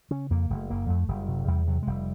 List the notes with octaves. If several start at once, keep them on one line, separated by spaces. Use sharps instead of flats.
C#3 C#4
F2 A#3
F#1 A3
F#1 A#3
F2 A3
F#1 G3
C3 F#3
E2 G3
C3 F#3
G#3
F1 G3